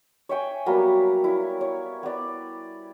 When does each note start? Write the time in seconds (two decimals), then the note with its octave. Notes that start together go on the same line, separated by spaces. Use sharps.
0.29 C#5 E5 G5 G#5
0.66 F#3 G3 A#3 B3
1.24 E4
1.61 C#5
2.03 B3 D5